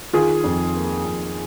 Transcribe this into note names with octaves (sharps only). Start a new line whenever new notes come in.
D#3 F4 G#4
F2
A#3
F2